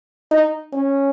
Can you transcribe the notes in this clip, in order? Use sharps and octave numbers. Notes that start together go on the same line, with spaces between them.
D#4
C#4